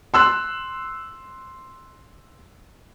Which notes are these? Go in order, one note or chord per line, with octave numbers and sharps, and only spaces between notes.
C6 E6 F#6